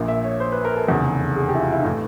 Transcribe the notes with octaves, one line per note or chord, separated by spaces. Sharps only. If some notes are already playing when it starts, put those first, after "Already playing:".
Already playing: A#1 A#2
E5
C#5
C5
B4
A#4
A4
F1 E2 C#3
G#4
G4
E4
F4
E4
D#4
A2 E3 E4